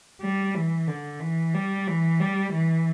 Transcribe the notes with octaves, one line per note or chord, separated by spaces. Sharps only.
G3
E3
D3
E3
G3
E3
G3
E3